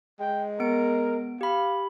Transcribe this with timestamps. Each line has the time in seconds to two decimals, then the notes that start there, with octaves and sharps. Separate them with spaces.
0.20 G#3 G5
0.60 B3 A#4 D7
1.41 G4 F5 B5